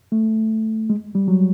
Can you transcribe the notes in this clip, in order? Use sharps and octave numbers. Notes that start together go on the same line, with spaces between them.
A3
G#3
G3
F#3